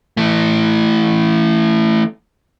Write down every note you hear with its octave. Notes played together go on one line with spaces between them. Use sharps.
E3 A3